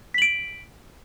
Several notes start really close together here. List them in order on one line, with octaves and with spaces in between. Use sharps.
B6 F#7 D7